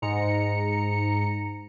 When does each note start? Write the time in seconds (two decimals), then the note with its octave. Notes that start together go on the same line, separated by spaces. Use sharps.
0.02 G#2 A#5 C#7